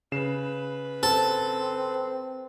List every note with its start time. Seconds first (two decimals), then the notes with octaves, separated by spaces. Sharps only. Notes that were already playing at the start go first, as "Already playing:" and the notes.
0.12 C#3 B4 C7 E7
1.03 C4 A4